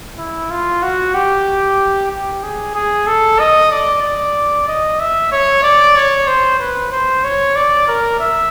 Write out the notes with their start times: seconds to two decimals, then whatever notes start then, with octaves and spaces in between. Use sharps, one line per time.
0.18 E4
0.51 F4
0.83 F#4
1.14 G4
2.11 G4
2.43 G#4
2.75 G#4
3.07 A4
3.40 D#5
3.72 D5
4.03 D5
4.68 D#5
5.00 E5
5.32 C#5
5.63 D5
5.96 C#5
6.28 C5
6.60 B4
6.92 C5
7.24 C#5
7.56 D5
7.88 A#4
8.20 E5